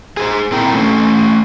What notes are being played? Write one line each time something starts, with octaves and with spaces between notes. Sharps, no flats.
G#4 A#4 C5
A#2 C4 E4 A#4 G5 A#5
A3 C#4